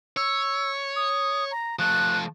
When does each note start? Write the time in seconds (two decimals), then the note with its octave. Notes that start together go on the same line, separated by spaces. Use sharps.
0.17 C#5 E6
0.96 D#6
1.51 A#5
1.79 F3 A3 F#6